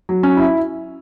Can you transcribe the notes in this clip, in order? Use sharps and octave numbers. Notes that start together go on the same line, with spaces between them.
F#3
C#4
E4